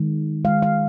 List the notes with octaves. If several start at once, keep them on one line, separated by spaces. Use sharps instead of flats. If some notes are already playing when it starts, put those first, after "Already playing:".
Already playing: D#3 G#3
D#3 G#3 F5
F5